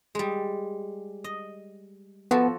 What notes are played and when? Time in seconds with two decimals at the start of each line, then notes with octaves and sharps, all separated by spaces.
0.15 G3 G#3
1.24 D#5
2.31 F3 B3 F#4 A4